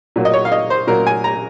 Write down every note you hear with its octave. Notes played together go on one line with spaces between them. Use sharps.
A#2 F#3 A#3
D#5
C#5
F5
D#5
C5
A#2 F#3 A#3 A#4
G#5
A#5